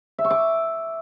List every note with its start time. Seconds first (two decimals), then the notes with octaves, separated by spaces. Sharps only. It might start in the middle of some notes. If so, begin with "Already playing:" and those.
0.19 E5
0.25 C#6
0.31 D6